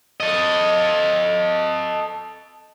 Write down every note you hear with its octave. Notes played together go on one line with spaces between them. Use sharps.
A4 D#5